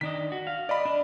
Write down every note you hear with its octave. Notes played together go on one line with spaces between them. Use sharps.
D#3 D4 D#5 B6
F#4
F5
D5 D#5 B5
D4